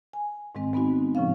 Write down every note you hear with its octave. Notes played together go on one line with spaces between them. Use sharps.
G#5
G#2 D#3 G#3 C4
G#3 B3 C4 D#4 F#4
A2 C#3 F3 C#4 F5